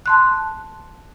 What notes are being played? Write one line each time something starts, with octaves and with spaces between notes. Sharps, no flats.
A5 C6 F#6